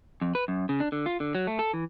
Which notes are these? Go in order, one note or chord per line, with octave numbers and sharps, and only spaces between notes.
F2
B4
F#2
C#3
D4
D3
F4
D3
F#3
A3
A4
E3